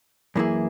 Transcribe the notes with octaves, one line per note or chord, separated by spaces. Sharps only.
F#2 E3 A#3 E4 G#4